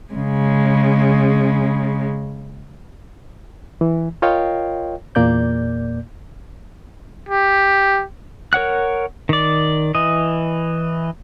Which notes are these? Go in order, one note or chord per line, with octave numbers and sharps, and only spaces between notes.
C#3 G#3
E3
F4 A#4 C#5 D#5 F5 G5
E2 A#2 A#3 D5 G6
G4
A#4 C#5 F#5 F#6
D#3 D5
E3 D#5